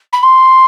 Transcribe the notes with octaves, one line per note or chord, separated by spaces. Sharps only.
B5
C6